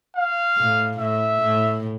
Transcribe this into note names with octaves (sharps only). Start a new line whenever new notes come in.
F5
A2
A2 E5
A2